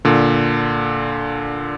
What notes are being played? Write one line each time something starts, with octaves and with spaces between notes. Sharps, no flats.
A#2 D3